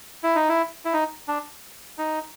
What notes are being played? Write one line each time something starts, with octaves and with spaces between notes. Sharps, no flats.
E4
D#4
E4
E4
D#4
D4
D#4